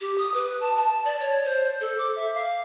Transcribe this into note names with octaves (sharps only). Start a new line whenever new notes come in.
G4
D#6
B4
A5
A5
D5
C#5
C5
A4
D6
E5
F5